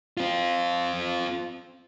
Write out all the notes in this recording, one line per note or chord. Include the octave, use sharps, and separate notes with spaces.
C4 F4